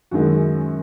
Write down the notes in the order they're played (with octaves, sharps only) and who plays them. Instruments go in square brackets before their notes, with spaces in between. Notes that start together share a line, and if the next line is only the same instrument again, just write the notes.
[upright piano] F#2 D#3 G#3 F#4